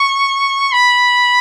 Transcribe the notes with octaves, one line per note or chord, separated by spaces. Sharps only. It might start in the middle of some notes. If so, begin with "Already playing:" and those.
Already playing: C#6
B5